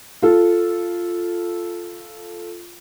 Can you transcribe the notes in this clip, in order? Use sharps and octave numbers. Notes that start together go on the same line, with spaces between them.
F4 A4